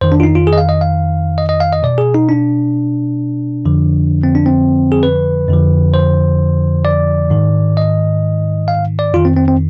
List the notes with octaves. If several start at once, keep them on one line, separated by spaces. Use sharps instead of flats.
F2 D#3 C5
D4
F4
D#4
F4
G#4
D#5
F5
D#5
F5
D#5
D#5
F5
D#5
B2 D5
G#4
D#4
D4
F2 D3 F3
C4
D4
C4
G#4
B4
F2 D3 F3
C5
D5
G#2 D#3
D#5
F5
D5
F2 D#3 F4
C4
C4
C4